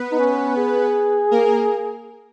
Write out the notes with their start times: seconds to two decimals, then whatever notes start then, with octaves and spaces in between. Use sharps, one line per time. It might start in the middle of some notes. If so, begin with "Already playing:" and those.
Already playing: B3 B4
0.11 D#4
0.19 C#4
0.57 G#4
1.31 A#3 A#4